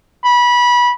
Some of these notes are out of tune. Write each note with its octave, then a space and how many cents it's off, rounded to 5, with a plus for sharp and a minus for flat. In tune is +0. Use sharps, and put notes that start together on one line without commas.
B5 -20